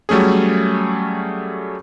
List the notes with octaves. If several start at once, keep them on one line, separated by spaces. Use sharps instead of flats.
F#3 G3 A3 C#4 G#4